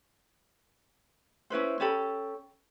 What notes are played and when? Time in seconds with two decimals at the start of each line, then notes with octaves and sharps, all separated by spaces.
1.50 C#4 E4 B4 C5
1.80 C#4 G4 A4 B5